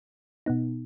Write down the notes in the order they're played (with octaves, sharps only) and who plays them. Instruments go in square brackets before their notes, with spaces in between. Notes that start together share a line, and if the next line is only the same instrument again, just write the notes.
[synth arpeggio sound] B2 B3 D#4